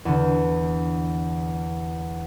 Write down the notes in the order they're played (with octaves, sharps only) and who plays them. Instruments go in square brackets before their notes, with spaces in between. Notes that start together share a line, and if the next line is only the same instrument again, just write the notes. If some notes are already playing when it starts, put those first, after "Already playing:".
[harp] E2 D3